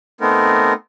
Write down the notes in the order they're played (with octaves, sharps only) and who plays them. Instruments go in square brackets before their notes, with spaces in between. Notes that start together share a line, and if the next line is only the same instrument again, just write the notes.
[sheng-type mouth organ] A3 B3 C4 D#4 A#4